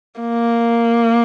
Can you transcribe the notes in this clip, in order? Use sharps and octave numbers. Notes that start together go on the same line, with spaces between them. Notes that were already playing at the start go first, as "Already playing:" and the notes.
A#3